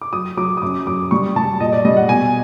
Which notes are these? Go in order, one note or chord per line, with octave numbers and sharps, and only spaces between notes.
D6
F#3 D#6
F#3 D6
D#6
F#2 D6
F#2 D6
G3 C#6
G3 A5
A#2 D#5
D5
G3 D#5
F#5
B2 G#5